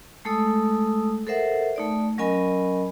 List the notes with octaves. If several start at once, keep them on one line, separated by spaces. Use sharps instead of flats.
G#3 A3 A4 D#6 E6
A4 A#4 C5 E5 F#5
A3 D#4 D5
F#3 C#4 A#4 D#5 G#5 B5